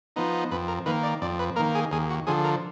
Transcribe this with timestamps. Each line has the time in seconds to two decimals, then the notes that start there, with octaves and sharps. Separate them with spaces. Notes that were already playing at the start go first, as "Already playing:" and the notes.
0.16 F3 B3 D#4
0.51 F2 B4
0.68 A#4
0.86 D#3 A#3 B4
1.03 D5
1.22 F2 D5
1.39 B4
1.56 D#3 A#3 A#4
1.75 G#4
1.92 D#2 G#4
2.10 F#4
2.27 D3 F3 G#4
2.44 A#4